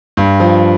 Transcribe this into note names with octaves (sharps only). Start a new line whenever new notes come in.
G2
F3